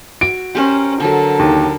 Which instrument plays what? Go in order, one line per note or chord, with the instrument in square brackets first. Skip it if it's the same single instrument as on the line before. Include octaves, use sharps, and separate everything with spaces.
[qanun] F#4 [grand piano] D7
[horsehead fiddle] C#4 [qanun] G4 A#4 C5
[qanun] D3 F#3 [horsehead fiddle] A4 A#4
[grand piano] D#2